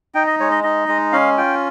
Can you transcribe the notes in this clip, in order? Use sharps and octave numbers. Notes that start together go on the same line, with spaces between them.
D#4 G5
D#5
G#3 C#5
D#5
D#4 D#5
G#3
C#4 F5
F4 G5